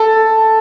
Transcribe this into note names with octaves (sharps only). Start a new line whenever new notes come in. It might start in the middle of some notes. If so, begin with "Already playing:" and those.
Already playing: A4